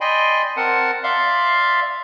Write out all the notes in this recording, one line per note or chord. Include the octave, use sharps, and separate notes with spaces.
D5 D#5 G5 G#5 B5 C6
C4 A#4 F#5 A5
D5 E5 F5 C6